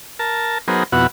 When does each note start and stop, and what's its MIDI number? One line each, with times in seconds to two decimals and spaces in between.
0.19 0.58 70
0.19 0.58 81
0.68 0.83 54
0.68 0.83 59
0.68 0.83 63
0.68 0.83 68
0.68 0.83 70
0.68 0.83 72
0.92 1.07 41
0.92 1.07 47
0.92 1.07 59
0.92 1.07 64
0.92 1.07 66
0.92 1.07 78